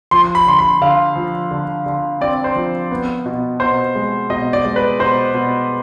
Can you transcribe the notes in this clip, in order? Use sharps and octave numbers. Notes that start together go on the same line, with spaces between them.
F3 C6
B5
D3 C6
B5
D3 F5
F3
D3
D3
C4 D5
C5
F3
B3
B2
B2 C5
G#3
B2 D#5
D5
G#3
B4
B2 C5
B2